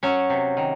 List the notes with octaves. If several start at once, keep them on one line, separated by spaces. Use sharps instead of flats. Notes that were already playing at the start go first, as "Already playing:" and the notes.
F#3 C#4 C#5
C3
D#3